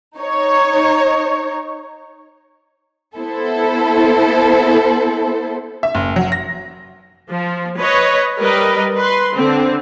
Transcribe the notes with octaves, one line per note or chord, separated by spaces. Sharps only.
D#4 C#5
B3 E4 A4 C5
E5
F#1
F#3
A#6
F3
B4 C#5 D#5
G3 A#4 B4 D#5
B4 C6
D3 C4